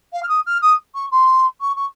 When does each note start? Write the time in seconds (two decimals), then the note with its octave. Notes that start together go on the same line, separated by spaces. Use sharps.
0.13 F5
0.23 F6
0.29 D#6
0.46 F6
0.62 D#6
0.95 C#6
1.12 C6
1.61 C#6
1.76 C#6